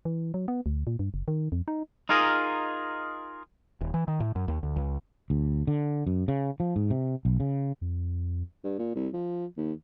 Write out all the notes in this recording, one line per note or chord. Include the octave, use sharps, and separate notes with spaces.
E3
F#3
B3
D2
A#2
G2
F#1
D#3
F2
D#4
D#4 F4 G#4 A#4 D#5
D#1
E3
D#3
A2
F#2
D#2
D2
C#2
D2
D3
F#2
C#3
F3
G#2
C3
B1
C#3
F2
G2
A#2
C2
F3
D#2